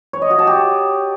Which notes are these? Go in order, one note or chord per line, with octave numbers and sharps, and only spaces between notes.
C#5
D#5
F#4
A5
G4